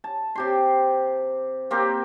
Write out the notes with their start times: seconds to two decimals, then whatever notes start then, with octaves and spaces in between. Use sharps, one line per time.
0.04 A5
0.35 C3 G4 C6
1.71 A#3 C4 G4 A#4